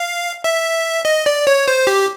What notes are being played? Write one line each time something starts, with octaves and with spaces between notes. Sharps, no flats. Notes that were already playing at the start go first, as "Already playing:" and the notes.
Already playing: F5
E5
D#5
D5
C#5
C5
G4